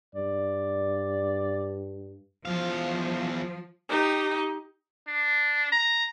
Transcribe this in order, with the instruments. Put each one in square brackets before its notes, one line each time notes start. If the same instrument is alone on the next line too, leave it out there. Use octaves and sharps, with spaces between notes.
[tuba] G2 [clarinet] D5
[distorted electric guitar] E2 F5 [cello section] F3
[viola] D#4 G4
[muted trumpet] D4
A#5